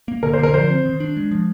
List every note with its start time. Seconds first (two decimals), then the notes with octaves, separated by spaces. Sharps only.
0.08 A#3
0.23 D3 A#4
0.33 C5
0.39 D3 A#4
0.54 F3 C5
0.70 C4
0.86 D#3
1.00 D4
1.17 G#3
1.31 F3